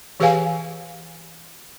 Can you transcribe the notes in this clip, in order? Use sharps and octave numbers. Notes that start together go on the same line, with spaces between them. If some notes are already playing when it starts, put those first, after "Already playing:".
E3 G4 G#4 B4 F5 G#5